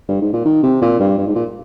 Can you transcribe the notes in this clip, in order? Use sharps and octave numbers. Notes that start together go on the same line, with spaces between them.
G2
G#2
A#2
D#3
C3
A#2
G2
G2
G#2
A#2